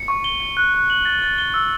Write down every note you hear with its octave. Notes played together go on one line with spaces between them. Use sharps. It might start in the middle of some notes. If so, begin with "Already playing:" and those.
Already playing: C#7
C#6
G7
C#7
F#6
F#6
F#7
A6
A6
G7
E6